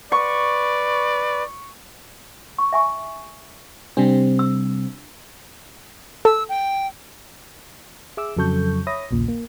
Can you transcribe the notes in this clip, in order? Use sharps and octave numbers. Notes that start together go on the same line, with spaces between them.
B4 D5 C#6
C#6
E5 G#5 C#6
C3 G3 C4 D4
E6
A4 E6
G5
G#4 E5 D6 E6
F2 C#3 F#3 A4 C#6 G6
C#5 E5 B5 D#6 A#6
A#1 D#2 A#2 C#3
A#3